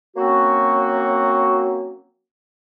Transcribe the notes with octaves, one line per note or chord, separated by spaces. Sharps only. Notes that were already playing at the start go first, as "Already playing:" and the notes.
F#3 A#3 C4 C#4 F#4